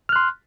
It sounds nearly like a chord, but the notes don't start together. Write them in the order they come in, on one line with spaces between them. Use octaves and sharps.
F6 F#6 C6